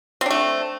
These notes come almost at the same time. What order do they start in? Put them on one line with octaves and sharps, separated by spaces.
C4 D4 A3